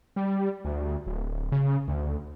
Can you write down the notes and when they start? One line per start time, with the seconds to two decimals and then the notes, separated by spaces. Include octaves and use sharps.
0.16 G3
0.65 D2
1.07 D1
1.52 C#3
1.88 D2